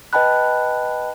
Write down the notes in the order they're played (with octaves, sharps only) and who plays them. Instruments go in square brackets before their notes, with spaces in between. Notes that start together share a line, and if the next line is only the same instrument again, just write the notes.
[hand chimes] B4 D#5 G5 A5 B5 F#6